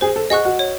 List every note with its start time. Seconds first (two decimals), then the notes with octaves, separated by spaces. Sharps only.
0.01 G#4 C5
0.16 A4
0.30 G#4 D#5 F#5 C#6 F#6
0.45 F#4
0.59 C#5